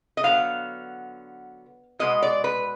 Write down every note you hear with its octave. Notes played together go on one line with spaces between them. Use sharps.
D#5
D3 F#3 B3 F5
B2 G#3 B3 D#5
D5
B4